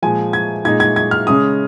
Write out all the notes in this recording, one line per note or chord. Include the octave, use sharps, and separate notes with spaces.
A#2 F3 G#3 G#5
G#6
A#2 G#3 D#4 G#6
G#6
G#6
F6
C#3 G#3 C#4 D#6